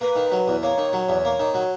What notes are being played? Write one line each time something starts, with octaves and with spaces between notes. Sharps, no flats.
A#3 B4
D#3
F#3
E2
A#3 C#5
D#3
F#3
E2
A#3
D#3
F#3